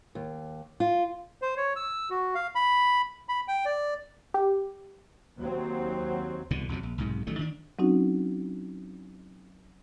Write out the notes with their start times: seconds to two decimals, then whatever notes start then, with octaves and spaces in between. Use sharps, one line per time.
0.15 D#2
0.80 F4
1.42 C5
1.57 C#5
1.76 E6
2.10 F#4
2.35 F5
2.55 B5
3.29 B5
3.48 G5
3.65 D5
4.34 G4
5.39 D#2 F#3 C4
6.51 C2 B2 D3 E3
6.69 A#1 F2 C3 F#3
6.83 A#1
6.98 B1 G#2 C3
7.27 A1 D#3 F#3 A3
7.39 D#3 D4
7.79 F#3 C4 C#4 D#4 E4 F#4